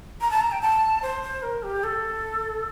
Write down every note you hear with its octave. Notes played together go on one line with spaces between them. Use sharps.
A#5
A5
A#5
G5
A5
C5
C5
A#4
G4
A4